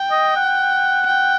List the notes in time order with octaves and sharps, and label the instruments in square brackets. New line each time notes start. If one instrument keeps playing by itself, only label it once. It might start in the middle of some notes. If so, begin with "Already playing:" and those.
Already playing: [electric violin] G5
[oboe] D#5
F#5
[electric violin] G5